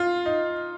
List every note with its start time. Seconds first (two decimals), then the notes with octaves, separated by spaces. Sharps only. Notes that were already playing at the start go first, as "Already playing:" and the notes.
Already playing: F4
0.26 D#4